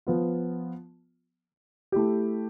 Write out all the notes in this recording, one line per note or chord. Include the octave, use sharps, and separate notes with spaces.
F3 B3 F4
A3 E4 G4